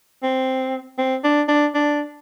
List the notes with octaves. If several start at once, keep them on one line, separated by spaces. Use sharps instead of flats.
C4
C4
D4
D4
D4